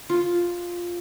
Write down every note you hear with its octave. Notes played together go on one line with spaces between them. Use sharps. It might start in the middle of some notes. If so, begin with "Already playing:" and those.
F4